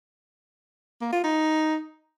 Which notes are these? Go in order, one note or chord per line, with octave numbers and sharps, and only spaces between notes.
A#3
F4
D#4